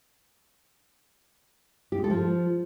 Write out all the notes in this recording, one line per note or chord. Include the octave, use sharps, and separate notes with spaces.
G4
G#3
A4
F3